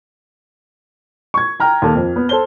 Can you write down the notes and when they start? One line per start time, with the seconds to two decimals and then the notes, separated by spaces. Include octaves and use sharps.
1.34 C#6 G#6
1.60 G5 A#5 F6
1.82 D#2 A4
1.95 F2
2.16 B3
2.29 A4 C5 G7